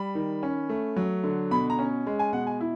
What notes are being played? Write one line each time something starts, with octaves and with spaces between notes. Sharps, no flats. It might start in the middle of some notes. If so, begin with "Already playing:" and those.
Already playing: G3 B5
D#3
C#4
A3
F#3
D3
B2 B5
A#5
C#4
G#3
G#5
B2 F#5
G#5
E4